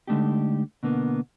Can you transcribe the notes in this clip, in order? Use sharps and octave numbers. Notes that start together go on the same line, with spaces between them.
D3 G#3 A3 D4 D#4 G4
B2 D3 A#3 B3